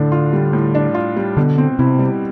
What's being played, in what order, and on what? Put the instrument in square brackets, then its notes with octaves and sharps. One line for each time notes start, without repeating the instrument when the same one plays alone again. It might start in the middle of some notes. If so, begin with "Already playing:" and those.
Already playing: [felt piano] A2 D4 [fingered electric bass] D3
[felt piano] F4
G3
A2
D4
F4
G3
[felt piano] B2 [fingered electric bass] D3
[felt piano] C4
[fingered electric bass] C3 [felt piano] E4
[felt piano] G3